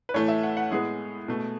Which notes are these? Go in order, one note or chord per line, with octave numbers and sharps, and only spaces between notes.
B4
A2 E3 A3 C#5
E5
F#5
F#5
A2 G#3 B3 G#4
B2 A3